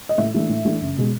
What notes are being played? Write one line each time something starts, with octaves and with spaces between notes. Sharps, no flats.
D#5
A2 E5
E3 A3 D4
A2
E3 A3 D4
F#1
B2 G#3